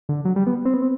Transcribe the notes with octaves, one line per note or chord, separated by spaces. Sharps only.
D3
F#3
G3
B3
C4
B3
C4